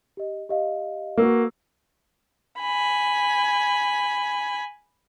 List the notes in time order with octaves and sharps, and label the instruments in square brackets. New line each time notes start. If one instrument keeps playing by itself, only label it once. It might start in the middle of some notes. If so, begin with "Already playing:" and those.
[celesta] G4 D#5
G4 D#5 F5
[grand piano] A#3 F#4 [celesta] B4 E6
[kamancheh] G#5 B5